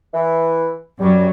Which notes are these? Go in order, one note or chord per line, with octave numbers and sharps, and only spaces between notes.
E3
F#2 F#3 G3